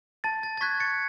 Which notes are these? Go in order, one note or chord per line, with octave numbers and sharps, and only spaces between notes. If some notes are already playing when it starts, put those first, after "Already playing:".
A5 A6
A6
A6
C#6 F#6 G#6 B6
A6 C#7